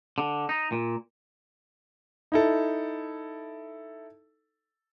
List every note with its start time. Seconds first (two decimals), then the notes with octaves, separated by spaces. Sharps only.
0.18 D3
0.49 D#4
0.72 A#2
2.32 D#4 E4 A4